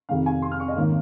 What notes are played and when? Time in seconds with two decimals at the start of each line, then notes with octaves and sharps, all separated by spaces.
0.09 F1 F2 C3 D#3 F5
0.26 G#5
0.42 C6
0.52 F6
0.60 C#6
0.68 D#5
0.76 G#1 D#3 A#3 C#4